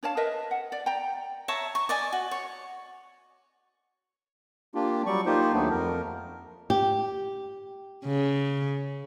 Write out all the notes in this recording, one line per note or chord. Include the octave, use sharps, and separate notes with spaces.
D4 C#5 F5 A5
A#4 B4 D#5 E5
F#5
D5
G5 A#5
C#5 E5 A5 A#5
C#6
D5 D#5 G#5
F#4
C#5
A#3 D4 F4 G4
F#3 G3 D5 C#6
A#3 D#4 F4 G4 C5
D#2 F#3 A3 B3 D4
F2 A#4
G4
C#3